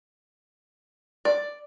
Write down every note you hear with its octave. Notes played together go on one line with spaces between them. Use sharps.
D5